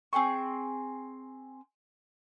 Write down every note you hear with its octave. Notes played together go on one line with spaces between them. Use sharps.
C4 G#4 G5 C#6